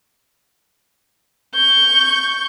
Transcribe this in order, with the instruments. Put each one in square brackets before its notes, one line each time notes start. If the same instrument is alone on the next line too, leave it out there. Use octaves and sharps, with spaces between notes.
[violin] C#6 G6